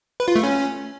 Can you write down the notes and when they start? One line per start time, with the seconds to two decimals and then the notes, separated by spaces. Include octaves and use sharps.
0.20 B4
0.28 F4
0.36 A3
0.43 C#4